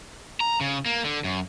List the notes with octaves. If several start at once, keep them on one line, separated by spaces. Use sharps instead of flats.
A#5
C#3
A#3
D3
F#2